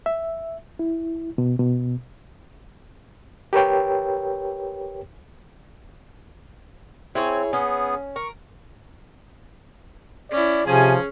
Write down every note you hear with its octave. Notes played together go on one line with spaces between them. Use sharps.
E5
E4
B2
B2
G4 A#4 B4 C#5 G5
C4 E4 G#4 C#5
B3 C#4 G#4
A#4 C#6
C#4 E4 D5
C3 F3 C#4 G#4 G#5